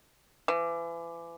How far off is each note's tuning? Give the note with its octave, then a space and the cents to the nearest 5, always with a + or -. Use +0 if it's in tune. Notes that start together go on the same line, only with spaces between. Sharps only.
E3 +35